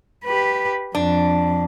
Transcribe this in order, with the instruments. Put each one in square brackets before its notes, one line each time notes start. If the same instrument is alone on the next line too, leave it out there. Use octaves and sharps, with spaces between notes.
[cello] G4 B4
[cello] F2 [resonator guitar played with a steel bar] D4